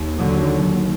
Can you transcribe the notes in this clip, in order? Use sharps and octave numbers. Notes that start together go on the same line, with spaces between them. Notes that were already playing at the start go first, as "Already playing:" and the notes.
Already playing: D#2
D3 F#3